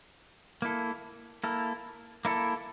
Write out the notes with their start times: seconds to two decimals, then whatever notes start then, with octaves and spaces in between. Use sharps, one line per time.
0.62 A#3 E4 A4
1.44 A#3 E4 A4
2.25 A#3 E4 A4